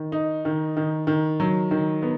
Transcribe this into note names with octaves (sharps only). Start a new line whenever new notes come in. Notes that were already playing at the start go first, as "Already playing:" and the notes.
Already playing: D#3
D#4
D#3
D#3
D#3
F#3
D#3
B3